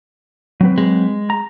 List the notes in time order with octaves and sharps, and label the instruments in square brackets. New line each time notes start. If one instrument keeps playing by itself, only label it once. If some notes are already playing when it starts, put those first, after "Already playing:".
[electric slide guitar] F#3 C4 B4
[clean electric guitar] G#3
[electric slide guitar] A#5